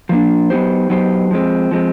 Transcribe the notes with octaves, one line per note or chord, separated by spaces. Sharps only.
F3 A#3 D4
F#3 B3 D#4 G4 C5
F#3 B3 D#4 G4 C5
F3 G#3 C4
F3 G#3 C4